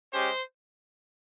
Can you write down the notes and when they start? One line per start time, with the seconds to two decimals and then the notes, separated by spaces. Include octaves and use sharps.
0.12 G#3 C#4 G4 C5